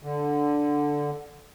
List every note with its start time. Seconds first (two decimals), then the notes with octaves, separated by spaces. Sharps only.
0.03 D3